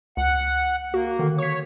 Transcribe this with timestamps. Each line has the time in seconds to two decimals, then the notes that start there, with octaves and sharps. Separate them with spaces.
0.17 C#2 F#5
0.94 A#3 F#4
1.19 D3 D#3
1.38 C#5 C#6 B6